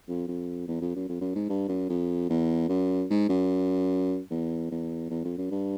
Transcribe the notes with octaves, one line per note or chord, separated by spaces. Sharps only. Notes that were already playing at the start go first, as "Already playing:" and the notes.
F2
F2
E2
F2
F#2
F2
F#2
G#2
G2
F#2
F2
E2
F#2
G#2
F#2
E2
E2
E2
F2
F#2
G2